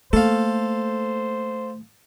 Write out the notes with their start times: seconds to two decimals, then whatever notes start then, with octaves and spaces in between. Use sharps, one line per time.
0.13 A3 A#3 A4 C5 F5